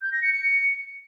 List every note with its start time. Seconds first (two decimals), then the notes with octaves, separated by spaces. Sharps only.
0.01 G6
0.12 A#6
0.22 C#7
0.32 C#7